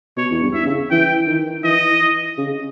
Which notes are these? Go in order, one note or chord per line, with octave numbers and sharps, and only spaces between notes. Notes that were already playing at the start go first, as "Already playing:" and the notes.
B2 C#5
E2
G2
E5
C#3
E3 G5
D#3
E3 D#5
C#3